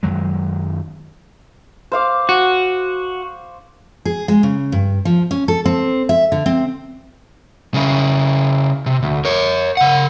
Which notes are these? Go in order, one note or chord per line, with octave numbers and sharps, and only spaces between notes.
F#2 D#3 F#3 G#3
C5 F5 D6
F#4
G#4
G#3
C#3
G2
F3
C#4
A4
C4
E5
D3
C4
C#3 E4
C3
D2
A#4 C#5
C#3 F#5